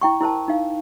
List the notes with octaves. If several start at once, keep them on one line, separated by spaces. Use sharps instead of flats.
E4 G5 C#6
E4 A#4 C5 A5
D#4 F5